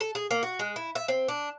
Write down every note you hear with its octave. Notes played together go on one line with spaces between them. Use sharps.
A4
G#4
A#3
F#4
G#3
E4
E5
C4
D4